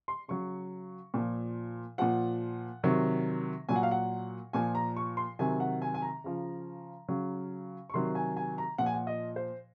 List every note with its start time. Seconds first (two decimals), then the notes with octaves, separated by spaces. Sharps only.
0.08 C6
0.28 C#3 F#3 C#6
1.14 A#2 F3
1.98 A#2 F3 F#5
2.84 C3 D#3 F#3
3.69 A#2 F#3 G#5
3.76 F#5
3.83 F5
3.91 F#5
4.53 A#2 F3 G#5
4.75 A#5
4.97 C#6
5.17 C6
5.39 C3 D#3 F#3 G#5
5.60 F#5
5.82 G#5
5.94 G#5
6.02 A#5
6.24 C#3 F3
7.08 C#3 F#3
7.90 C#6
7.94 C3 D#3 F#3 C6
8.15 G#5
8.37 G#5
8.58 A#5
8.78 A#2 F3 F#5
8.86 G#5
8.94 F#5
9.07 D#5
9.36 C5